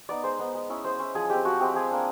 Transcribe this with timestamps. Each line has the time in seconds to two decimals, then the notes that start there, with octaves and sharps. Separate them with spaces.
0.09 B3 D#4 D5
0.24 G#3 C5
0.39 B3 D#4
0.55 G#3
0.70 C#4 E4
0.85 G#3 C5
1.00 C#4 E4
1.15 F3 G#4
1.30 G#3 C4 G4
1.45 F3 F#4
1.61 G#3 C4 G4
1.75 F3 G#4
1.91 A#3 D4